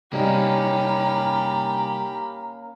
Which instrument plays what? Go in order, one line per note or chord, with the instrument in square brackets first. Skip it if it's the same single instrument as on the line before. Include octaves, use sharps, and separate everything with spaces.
[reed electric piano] C3 G3 D#4 [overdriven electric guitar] A#3 C#4 [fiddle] G4 B5 [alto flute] A#5